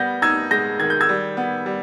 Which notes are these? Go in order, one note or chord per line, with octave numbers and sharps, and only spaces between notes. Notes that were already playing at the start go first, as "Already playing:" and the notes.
Already playing: G3 B3 G6 A#6
D#4 E6 G#6
G#3 G6 A#6
D#3 G#6
G6
E6 G#6
G3
B3
G3